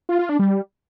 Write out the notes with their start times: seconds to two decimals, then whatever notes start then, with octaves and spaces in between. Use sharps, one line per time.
0.09 F4
0.19 F4
0.29 D4
0.39 G3